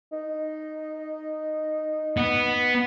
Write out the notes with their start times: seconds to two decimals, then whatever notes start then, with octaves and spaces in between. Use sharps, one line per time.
0.12 D#4
2.17 B3